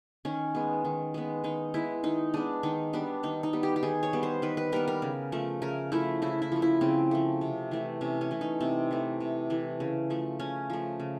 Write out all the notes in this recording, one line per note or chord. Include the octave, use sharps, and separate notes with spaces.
D#3 C#4
G#3 B3
D#3
G#3 B3
D#3 D#4
G#3 B3 E4
D#3 D#4
G#3 B3 D4
D#3 D#4
G3 B3 D4
D#3 D#4
D#4
G3 B3
G4
G4
D#3 G#4
C#5
G3 B3
C5
D#3 B4
B4
G3 B3 A#4
A#4
C#3
F3 A3
C#3 A#4
F3 A3 E4
C#3 E4
E4
F3 A3
E4
C#3 C4
F3 A3
C3
E3 A3
C3 C#4
C#4
E3 A3
D#4
C3 C4
E3 A3
C3
E3 A3
C#3
F3 A3
C#3 C#4
F3 A3
C#3